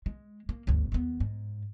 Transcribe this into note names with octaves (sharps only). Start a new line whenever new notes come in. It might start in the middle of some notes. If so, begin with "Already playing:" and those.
G#3
A#3
G1 D2
D#2 B3
G#2